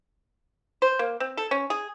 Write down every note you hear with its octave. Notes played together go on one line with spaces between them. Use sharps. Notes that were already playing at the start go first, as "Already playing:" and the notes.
C5
A#3
C4
A4
C#4
G#4